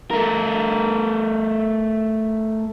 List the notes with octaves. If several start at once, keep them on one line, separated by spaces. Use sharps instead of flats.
A3 A#4